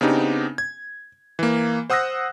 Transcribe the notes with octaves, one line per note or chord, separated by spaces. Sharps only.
C#3 B3 C4 D4 D#4 G4
G#6
E3 A#3
C5 F#5 D#6 E6 F#6 A#6